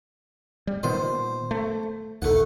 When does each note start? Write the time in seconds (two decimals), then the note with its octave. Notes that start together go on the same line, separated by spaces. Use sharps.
0.67 G3
0.83 A#2 D#3 B3 C5
1.51 A3
2.22 A#1 D#2 A3 F#5